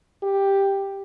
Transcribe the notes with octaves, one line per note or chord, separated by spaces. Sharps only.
G4